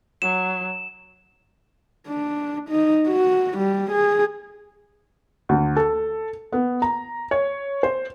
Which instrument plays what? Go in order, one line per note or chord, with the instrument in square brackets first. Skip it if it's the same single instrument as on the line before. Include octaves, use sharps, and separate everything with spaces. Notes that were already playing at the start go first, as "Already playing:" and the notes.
[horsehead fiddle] F#3 [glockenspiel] E7
[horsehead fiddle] D4
D#4
F#4
G3
G#4
[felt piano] D2
A4
B3
A#5
C#5
C5